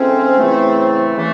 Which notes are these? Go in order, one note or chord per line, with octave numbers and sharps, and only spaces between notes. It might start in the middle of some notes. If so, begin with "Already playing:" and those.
Already playing: G#2 F3 A3 C4 C#4
E2 C#3 E3 A3
C#3 E3 A3